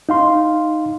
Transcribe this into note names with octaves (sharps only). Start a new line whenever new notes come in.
D#4 F5 C6